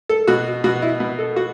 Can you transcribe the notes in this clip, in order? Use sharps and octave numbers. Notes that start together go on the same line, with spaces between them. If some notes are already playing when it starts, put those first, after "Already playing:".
A4
B2 F#4
B2 F#4
E4
B2
A4
F#4